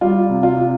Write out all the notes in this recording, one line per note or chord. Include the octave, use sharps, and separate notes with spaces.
G3 F4
C3
F4
C3